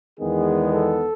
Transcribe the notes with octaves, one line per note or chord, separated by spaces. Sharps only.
E2 D#3 G#3 B3 G#4
A4